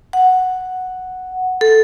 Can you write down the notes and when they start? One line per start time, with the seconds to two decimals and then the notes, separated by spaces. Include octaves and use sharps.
0.13 F#5
1.61 A4